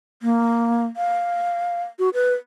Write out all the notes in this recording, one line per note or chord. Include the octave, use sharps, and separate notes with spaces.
A#3
F5
F#4
B4